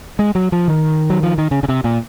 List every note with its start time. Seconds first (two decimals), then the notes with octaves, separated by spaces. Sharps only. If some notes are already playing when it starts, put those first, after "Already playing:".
0.19 G#3
0.35 F#3
0.52 F3
0.68 D#3
1.10 F#3
1.23 F3
1.38 D#3
1.51 C#3
1.63 C#3
1.69 C3
1.84 A#2